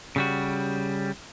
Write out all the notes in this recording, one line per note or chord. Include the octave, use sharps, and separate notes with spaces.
C#3 G3 F#4